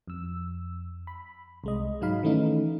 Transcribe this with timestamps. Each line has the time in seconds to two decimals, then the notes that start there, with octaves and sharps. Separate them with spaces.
0.07 F2 E6
1.07 B5
1.64 C2 G#3 D#5
2.01 G#2 F#3 D#4 F5 B5
2.23 D#3 E3 A3 C#4 D#4